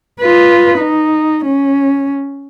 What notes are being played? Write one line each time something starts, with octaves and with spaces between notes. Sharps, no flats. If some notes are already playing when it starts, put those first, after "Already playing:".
F4 B4
D#4
C#4